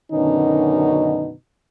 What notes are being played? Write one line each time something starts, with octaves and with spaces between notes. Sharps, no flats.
F#2 B2 D3 D#3 C#4 D#4